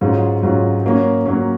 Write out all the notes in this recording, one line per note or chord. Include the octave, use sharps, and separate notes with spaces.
G#2 F#3 C#4 F4
G#2 F#3 C#4 F4
F#3 A#3 C#4
F#3 A#3 C#4